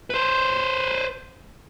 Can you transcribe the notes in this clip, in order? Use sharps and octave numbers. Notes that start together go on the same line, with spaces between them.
B4 C5